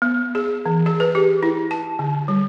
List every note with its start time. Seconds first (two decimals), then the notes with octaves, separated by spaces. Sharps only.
0.02 B3
0.35 G#4
0.66 E3
0.86 G#4
1.00 B4
1.15 G4
1.43 E4
1.71 A5
1.99 D3
2.28 G3